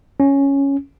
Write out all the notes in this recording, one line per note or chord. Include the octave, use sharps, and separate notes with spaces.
C#4